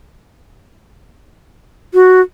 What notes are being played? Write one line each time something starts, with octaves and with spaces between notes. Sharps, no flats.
F#4